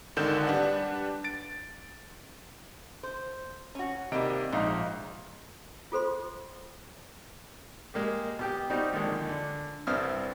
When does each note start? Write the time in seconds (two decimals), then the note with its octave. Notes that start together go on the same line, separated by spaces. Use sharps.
0.16 G#1 D3 D#3 G6 E7
0.47 G3 D4 B4 F#5
1.24 A6 D7
3.03 C5
3.75 C#4 F#4
4.12 C3 D#3 G3 A#3 D#5 D7
4.52 A#1 G#2 D#4 F5 A#5
5.92 F4 A4 C5 C6
7.94 G#3 A#3 G4
8.39 B2 G4 G5
8.70 G3 C4 D#4 F#4 G4
8.93 A#1 D3 D#3 G#3
9.29 D3
9.87 C2 G2 C4 E5 D#6 F6